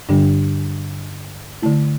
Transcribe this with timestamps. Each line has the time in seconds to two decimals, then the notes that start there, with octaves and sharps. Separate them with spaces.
0.09 G2 D3 G3 D4
1.62 D3 A3 E4